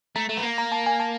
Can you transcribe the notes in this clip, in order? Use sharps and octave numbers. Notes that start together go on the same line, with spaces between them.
A3 A#5
A3
B3
A#3
A#5
A5
G#5
A5